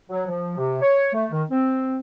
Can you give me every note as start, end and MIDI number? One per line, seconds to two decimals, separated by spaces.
0.10 0.24 54
0.26 0.56 53
0.57 0.77 48
0.81 1.12 73
1.13 1.25 57
1.31 1.43 51
1.50 1.98 60